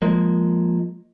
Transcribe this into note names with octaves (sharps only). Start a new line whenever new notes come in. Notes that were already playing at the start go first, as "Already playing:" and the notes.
F3 G#3 A#3